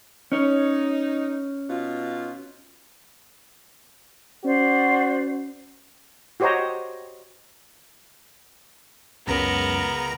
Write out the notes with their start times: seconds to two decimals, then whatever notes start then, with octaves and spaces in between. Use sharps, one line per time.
0.32 C#4 D#4 C#5
1.69 B2 D#4 F4
4.44 C#4 F#4 C5 D5
6.40 F#4 G4 C5 C#5 D#5 A#5
9.27 C#2 F#2 B3 A#4 A#5